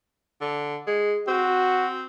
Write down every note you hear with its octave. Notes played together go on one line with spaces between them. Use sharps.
D3
G#3
C4 F#4